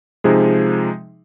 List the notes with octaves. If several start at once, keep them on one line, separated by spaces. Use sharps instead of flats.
C3 F3 G#3 D#4 G#4